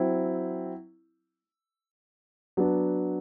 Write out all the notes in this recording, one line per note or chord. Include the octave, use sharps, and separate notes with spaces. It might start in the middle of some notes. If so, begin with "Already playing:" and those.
Already playing: F#3 C4 E4
F#3 B3 D4